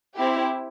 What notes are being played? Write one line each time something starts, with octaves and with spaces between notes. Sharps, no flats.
C4 E4 G4